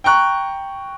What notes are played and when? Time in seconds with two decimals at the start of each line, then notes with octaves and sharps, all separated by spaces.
0.04 G5 A#5 C#6 F#6